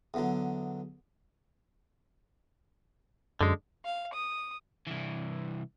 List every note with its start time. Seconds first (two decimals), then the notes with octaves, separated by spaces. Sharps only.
0.14 E2 D3 F#3
3.41 F#2 D3 G#3
3.85 F5
4.14 D#6
4.87 C2 E3